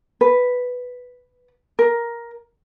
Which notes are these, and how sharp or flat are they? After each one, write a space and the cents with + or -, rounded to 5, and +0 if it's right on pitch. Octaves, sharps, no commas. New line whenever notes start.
B4 +0
A#4 +10